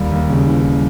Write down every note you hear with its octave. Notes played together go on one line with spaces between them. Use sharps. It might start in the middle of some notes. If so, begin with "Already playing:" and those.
Already playing: D#2 G3
D#2
C#3
E3
G3